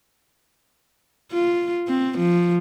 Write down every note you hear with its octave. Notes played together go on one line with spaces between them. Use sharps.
F4
C4
F3